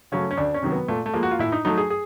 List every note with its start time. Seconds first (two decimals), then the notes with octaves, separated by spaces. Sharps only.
0.12 C#3 F#3 A3 C#4
0.31 C#4
0.37 D2 D4
0.54 C#4
0.63 C3 D#3 F#3
0.72 B3
0.88 A#2 A3
1.06 A3
1.14 F3 G#3 A#3
1.23 F#4
1.31 F4
1.39 A2 E4
1.52 D#4
1.65 F#3 A3 D#4
1.78 G#4
1.90 G#4